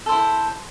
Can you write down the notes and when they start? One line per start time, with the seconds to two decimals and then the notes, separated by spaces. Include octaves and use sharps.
0.06 A4
0.09 C5
0.12 E4